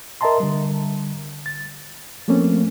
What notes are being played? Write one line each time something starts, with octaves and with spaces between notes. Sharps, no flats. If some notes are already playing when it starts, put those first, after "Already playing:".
A#4 D#5 E5 A5 A#5 C6
D3 G3
A6
F3 A3 A#3 C4 C#4